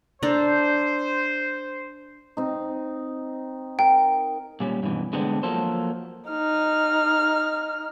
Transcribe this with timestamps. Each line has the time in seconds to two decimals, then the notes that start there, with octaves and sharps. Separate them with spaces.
0.22 D4 A4 C5 A#5
2.37 C4 D#4
3.79 A#4 G5
4.60 A#2 G3 C#4
4.83 G2 B2 E3
5.13 D3 G#3 B3 C4 D4
5.43 F3 F#3 A#3 A4 C5
6.30 D#4 F6